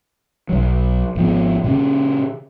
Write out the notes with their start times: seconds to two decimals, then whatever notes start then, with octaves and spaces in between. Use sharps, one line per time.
0.49 B1 F#3
1.15 G#1 F3 B3
1.64 A#2 C#3 C#4